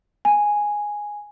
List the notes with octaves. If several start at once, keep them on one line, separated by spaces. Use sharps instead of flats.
G#5